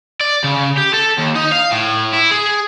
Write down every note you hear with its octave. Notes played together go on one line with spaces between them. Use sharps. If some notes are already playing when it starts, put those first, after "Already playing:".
D5
C#3
G4
A4
D#2
D#4
F5
A2
E4
G#4